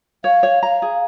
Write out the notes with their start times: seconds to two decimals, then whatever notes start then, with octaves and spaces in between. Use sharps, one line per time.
0.24 C#5 F5
0.43 C#5
0.63 F5 A#5
0.82 G#4